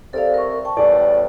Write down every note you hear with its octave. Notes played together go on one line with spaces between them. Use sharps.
C2 C3 A4 D5 F5
A#4 C#6
G5 A5 C#6
E2 A2 G3 D5 G#5